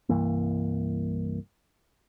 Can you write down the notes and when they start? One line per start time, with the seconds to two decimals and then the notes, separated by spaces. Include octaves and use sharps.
0.09 C2 G2 E3 A#3